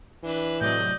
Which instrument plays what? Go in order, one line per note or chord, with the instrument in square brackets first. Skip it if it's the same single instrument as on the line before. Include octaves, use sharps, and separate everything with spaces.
[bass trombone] E3 [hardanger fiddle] D4 B4
[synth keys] A2 C3 F#3 [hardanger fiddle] D5 D#5 [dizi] G6